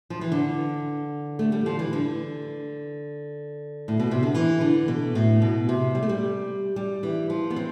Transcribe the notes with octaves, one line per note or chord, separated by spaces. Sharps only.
F3
E3
D3
A3
G3
F3
E3
D3
A2
B2
C3
D3
E3
D3
B2
A2
B2
C3
G3
A3
G3
G3
E3
F3
B3
C4